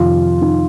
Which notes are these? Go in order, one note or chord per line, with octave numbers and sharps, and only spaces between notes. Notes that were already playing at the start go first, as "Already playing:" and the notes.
Already playing: F2 C3 D#3 F4
D#4